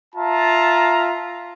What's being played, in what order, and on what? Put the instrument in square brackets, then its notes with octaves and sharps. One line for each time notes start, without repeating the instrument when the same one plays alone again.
[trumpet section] F4 E5 A5 A#5